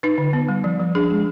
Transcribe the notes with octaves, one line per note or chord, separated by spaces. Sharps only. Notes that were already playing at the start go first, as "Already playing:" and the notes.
D#4 B4
D3
B3
G3
F3
F3
D4 G#4
G#3